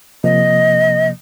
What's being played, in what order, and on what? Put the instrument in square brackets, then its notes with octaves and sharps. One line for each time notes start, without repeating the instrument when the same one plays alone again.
[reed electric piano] C3 F3 A#3 [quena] D#5